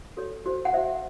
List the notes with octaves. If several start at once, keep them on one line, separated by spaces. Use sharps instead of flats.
F#4 A4 C#5
F#4 C5
F#5
F#4 C5 E5